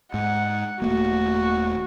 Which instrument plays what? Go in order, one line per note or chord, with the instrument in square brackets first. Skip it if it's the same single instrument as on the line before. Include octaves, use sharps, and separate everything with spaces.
[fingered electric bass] G#2 [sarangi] F#5
[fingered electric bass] D#1 A3 A#3 [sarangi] F#4